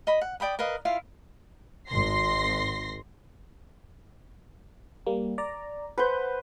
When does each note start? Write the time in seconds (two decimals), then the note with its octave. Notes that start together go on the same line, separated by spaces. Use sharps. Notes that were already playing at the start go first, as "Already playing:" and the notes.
0.07 D#5 B5
0.21 F#5
0.40 D5 G5 B5 D#6
0.59 A#4 B4 D#5 F5
0.85 E4 F4 F5
1.88 G#1 C6 A#6 C7
5.07 G3 A#3
5.38 D5 A#5
5.98 B4 C5 F#5 B5 G6